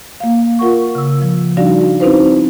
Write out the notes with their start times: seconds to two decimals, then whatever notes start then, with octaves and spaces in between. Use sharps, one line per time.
0.20 A#3 F5
0.59 F4 A#4 F#5 C#6
0.95 C#3 E6
1.22 F3
1.57 G3 D4 D#4 F#4 D5 F5
2.00 C4 C#4 D#4 E4 B4 C5